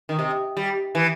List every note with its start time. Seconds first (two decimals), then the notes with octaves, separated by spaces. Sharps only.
0.09 D#3
0.19 C3
0.57 G3
0.95 E3